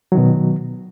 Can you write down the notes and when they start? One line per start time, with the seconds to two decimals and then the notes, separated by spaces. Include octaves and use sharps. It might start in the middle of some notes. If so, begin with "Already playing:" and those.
0.12 F#3
0.15 D#3
0.18 B2